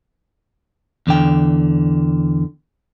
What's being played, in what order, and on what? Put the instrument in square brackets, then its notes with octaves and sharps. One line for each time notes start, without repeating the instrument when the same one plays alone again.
[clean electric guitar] E2 D3 G5